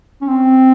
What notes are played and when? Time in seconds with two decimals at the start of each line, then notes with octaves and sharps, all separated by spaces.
0.21 C#4
0.28 C4